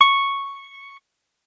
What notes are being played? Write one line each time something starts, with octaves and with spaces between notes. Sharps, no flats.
C#6